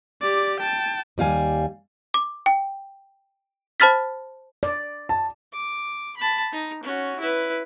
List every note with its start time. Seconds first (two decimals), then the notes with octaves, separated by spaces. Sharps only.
0.22 G4 D5
0.60 G5 A5
1.18 D#2 G3 F5 G#5
2.14 D6
2.46 G5
3.80 C5 A5 B5 F6 A6 B6
4.63 D5
5.09 A5
5.53 D6
6.17 A5 B5
6.52 D#4
6.83 C#4 F#4
7.20 E4 B4